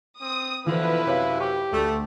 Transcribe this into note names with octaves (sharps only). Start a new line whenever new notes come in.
C4 D#6
B2 D3 E3 F3 E4 B4
F#2 C3 C#5 F5
G4 C#6
D2 A3